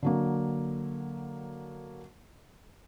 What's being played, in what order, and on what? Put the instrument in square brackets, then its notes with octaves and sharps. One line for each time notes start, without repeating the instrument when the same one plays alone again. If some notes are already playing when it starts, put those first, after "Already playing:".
[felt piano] D3 F#3 A#3